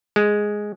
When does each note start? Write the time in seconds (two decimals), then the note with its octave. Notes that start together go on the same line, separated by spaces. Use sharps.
0.16 G#3